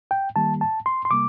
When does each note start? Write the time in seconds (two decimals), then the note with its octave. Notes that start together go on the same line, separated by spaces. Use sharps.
0.11 G5
0.36 D#3 G3 A#3 A5
0.61 A5
0.86 C6
1.05 C6
1.11 C3 G3 A#3 D6